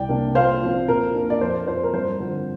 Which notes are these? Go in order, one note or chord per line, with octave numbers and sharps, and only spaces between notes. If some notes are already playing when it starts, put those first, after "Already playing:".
Already playing: C2 D5 G5
C3 A#3 D4
A#2 C5 F5
F3 C4
A#2 A#4
A#3 D4
D5
F2 C5
F3 C4 C5
A#4
G2 C5
D3 F3 C4